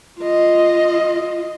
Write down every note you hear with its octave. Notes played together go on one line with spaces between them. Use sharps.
F4 D#5